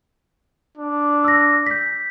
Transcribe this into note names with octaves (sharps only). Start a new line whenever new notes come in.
D4
E6 A#6
G6 B6